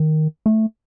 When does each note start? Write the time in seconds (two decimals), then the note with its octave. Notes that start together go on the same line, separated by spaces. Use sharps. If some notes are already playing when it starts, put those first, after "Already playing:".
Already playing: D#3
0.46 A3